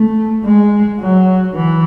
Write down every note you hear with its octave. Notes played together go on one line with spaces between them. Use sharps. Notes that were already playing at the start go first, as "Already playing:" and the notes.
Already playing: A3
G#3
F#3
E3